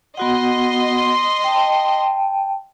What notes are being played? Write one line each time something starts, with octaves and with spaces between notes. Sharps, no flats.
B3 F#4 D#5 F#5 C6
G5 A5